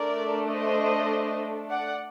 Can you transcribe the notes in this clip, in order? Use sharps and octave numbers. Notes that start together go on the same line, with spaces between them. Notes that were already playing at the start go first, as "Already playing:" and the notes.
Already playing: A3 D4 A4 A#4 D5
C5 D#5
D5 F#5